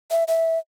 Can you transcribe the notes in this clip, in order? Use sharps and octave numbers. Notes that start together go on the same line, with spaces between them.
E5
E5